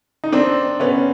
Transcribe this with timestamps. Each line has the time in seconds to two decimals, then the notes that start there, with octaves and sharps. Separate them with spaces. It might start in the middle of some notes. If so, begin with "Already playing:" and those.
0.24 D#4
0.32 C4 D4
0.80 B3 C#4